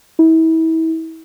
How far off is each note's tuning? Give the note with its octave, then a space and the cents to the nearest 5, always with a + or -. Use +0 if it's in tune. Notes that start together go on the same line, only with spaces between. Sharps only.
E4 -35